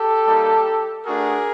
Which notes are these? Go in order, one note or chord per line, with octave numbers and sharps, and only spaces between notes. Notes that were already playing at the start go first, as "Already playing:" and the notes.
Already playing: G4 A4
G3 A#3 D#4
A3 D4 F#4 G#4 A#4